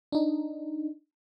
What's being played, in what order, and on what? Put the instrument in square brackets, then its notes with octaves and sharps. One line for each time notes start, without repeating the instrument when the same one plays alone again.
[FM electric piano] D4 D#4